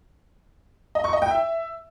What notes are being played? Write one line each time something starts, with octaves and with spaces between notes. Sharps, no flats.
D#5
C#6
D#5
G5
E5